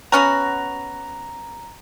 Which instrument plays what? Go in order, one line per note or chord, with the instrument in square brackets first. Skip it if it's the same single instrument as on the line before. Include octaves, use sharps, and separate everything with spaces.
[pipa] B3 C#4 F#4 [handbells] A#5